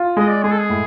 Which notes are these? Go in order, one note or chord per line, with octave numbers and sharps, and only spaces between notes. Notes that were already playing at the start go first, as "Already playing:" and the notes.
Already playing: F4
G#3 D#5
D5
G#3 G#4
A4
G#4
A2